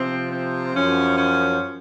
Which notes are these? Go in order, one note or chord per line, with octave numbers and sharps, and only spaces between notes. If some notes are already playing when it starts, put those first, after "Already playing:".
Already playing: C3 F3 C4
C4
F#2 F3 C#4
C#4